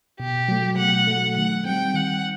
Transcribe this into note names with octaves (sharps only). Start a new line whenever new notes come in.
B2 G4
F#3 A3
B2 F#5
F#3 A3
D#3 F#5
G3 C4 G5
D#3 F#5